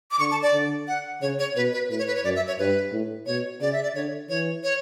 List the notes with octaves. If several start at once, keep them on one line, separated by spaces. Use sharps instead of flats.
D6
D3 C#6
A5
D5
D3
F#5
C#3 C#5
C#5
B2 B4
B4
A2 B4
C#5
B4
C#5
F#2 D5
E5
C#5
G2 B4
A2
B2 C#5
C#3 D5
E5
D5
D3 C#5
E3 C#5
C#5